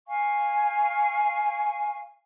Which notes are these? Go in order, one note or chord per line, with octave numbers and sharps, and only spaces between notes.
F5 G#5 C#6